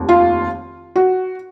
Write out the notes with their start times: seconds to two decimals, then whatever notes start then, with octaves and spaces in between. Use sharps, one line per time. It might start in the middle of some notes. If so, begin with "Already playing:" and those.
Already playing: F1 D#2
0.09 F4
0.96 F#4